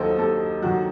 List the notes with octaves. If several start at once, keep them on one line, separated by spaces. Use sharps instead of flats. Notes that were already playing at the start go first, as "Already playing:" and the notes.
Already playing: D#2 D#3 F#3 A4 C5 D#5
D#2 A4
D#3 F#3 F#4